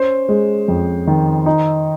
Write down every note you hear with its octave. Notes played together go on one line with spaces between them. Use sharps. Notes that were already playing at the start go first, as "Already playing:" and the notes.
Already playing: C#4 C5
G#3
F2
D#3
D#4